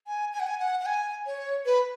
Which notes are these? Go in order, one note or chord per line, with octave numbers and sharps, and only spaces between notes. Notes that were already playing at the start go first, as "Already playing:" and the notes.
G#5
G#5
F#5
G#5
F#5
F#5
G#5
C#5
B4